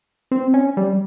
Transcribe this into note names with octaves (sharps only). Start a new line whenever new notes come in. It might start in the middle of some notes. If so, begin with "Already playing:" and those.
C4
C#4
G3